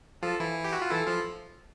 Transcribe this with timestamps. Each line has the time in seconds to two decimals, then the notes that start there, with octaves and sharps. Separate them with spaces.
0.22 F3 F4 A4
0.40 E3 E4
0.64 G4
0.73 F#4
0.82 F4
0.90 E3 E4 A4
1.07 F3 F4